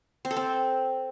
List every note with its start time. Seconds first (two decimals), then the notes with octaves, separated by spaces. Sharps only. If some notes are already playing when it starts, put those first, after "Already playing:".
0.25 C4
0.31 A4
0.37 C4